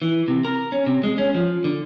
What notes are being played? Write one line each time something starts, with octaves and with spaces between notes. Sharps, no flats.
E3
C3
A#4
C#4
C3
G#3
C#4
F3
D3